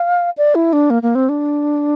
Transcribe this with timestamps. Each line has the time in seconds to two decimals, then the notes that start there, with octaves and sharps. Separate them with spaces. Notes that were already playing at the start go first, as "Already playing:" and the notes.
Already playing: F5
0.38 D5
0.55 E4
0.73 D4
0.90 A#3
1.03 A#3
1.15 C4
1.29 D4